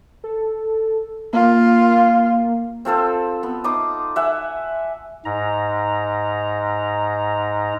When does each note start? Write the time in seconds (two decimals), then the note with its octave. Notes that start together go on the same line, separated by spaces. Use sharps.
0.24 A4
1.33 A#3 F4
2.85 C4 F4 A4 C5
3.43 B3
3.64 D#4 C6 D6 D#6
4.16 E5 F#5 G#5
5.25 G#2 A#5